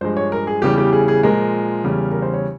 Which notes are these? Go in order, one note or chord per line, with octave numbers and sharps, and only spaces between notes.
G2 F3 G#3 C5
C#5
A#4
G#4
E2 C#3 E3 G3 G4
G4
G#4
G#4
A#2 F3 G#3 A#4
E2 C#3 G3
A#4
C5
C#5